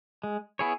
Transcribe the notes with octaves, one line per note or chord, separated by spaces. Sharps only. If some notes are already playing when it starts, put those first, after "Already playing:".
G#3
B3 E4 G#4 C#5